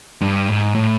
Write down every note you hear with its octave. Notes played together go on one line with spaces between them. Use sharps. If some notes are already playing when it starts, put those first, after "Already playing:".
G2
G#2
A2